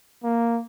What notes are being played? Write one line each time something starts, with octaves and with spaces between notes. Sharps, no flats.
A#3